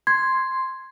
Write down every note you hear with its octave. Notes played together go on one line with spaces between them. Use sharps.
C6 G#6